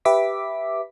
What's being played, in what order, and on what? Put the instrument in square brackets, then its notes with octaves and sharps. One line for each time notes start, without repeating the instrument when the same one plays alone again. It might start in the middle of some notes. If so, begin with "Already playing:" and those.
[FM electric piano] G4 B4 E5 D6 B6